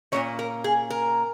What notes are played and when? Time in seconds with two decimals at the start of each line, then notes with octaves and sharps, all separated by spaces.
0.12 A#2 F#3 A#3 C#4 C#5
0.39 A#4
0.64 G#4
0.90 A#4